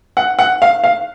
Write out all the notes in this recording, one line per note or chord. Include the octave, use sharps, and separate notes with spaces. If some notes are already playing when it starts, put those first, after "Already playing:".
F#5
F#5
F5
F5